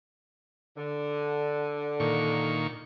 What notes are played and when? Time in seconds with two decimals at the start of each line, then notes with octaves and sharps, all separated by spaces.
0.77 D3
2.00 A#2 D#3 C#6